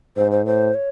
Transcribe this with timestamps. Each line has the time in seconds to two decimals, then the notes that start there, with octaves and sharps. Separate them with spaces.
0.17 G#2 C5
0.31 C5
0.45 A2 C5
0.74 C#5